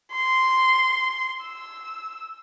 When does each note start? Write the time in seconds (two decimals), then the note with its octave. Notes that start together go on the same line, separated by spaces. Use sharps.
0.12 C6
1.42 E6